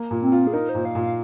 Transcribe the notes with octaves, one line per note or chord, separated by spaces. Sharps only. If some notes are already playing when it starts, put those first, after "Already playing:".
Already playing: A#3
A#2
C4
F4
G#4
D#4 A#4
C5
A#2
F5
A#2
F5